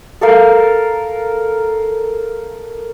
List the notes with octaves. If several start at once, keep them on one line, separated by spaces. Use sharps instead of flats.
A4 A#4 F5